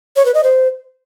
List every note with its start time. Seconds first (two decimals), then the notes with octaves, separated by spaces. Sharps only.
0.16 C#5
0.25 B4
0.34 D#5
0.43 C5